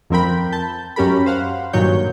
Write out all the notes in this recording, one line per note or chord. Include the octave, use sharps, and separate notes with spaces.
F2 F3 C4 A#4 G5 B5
A5 G6
F#2 C#4 G4 A#4 B5
C5 F5 F#5
G2 A#2 D#3 F#3 C#5 G6